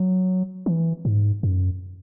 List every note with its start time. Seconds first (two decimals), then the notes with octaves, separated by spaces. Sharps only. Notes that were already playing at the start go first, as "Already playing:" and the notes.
Already playing: F#3
0.66 E3
1.05 G#2
1.43 F#2